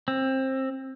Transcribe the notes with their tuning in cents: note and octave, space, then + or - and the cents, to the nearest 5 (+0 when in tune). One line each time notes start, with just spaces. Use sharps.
C4 +20